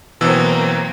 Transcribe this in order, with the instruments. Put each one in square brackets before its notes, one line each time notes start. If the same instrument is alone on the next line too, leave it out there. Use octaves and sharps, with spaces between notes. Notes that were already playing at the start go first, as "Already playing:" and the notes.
[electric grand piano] B2 E3 E6 [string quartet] F#3 A#3 C4